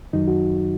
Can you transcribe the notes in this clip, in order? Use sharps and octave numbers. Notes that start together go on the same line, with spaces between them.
F#2 D#3 F#3 D#4
F#4